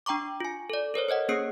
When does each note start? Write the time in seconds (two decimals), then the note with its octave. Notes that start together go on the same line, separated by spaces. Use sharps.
0.06 D4 G5 A#5 C#6 D6
0.40 F4 G#5
0.70 A4 D5
0.94 A4 A#4 C5 C#5
1.09 C5 C#5 D#5 F#5
1.28 A#3 C#4 G#4 D#6 C7 C#7